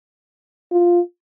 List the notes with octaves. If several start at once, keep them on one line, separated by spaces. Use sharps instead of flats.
F4